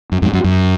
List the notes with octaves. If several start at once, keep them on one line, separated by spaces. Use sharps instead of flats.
F#2
F2 G#2
F#2
F#2